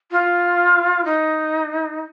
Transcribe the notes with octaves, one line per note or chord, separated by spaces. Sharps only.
F4
D#4